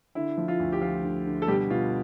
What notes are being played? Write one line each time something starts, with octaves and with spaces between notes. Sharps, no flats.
D3 E4
F3
F4
D2
G4
F3 F4
D3
D3
A4
B2 G3 G4
B2 F4